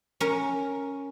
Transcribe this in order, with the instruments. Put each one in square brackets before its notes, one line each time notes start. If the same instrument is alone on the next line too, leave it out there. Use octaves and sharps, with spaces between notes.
[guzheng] C#4 A#4